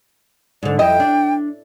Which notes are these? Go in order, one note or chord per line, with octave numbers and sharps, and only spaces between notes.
G#2 D3 D5
F2 E4 D#5 G5
D4